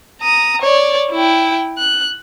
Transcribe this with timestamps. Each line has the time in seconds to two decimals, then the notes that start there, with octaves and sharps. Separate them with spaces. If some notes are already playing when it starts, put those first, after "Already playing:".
0.20 A#5 D#6
0.62 C#5 D5
1.12 E4 G5
1.78 F#6